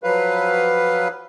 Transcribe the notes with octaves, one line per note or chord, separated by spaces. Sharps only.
F3 F#3 B4 F5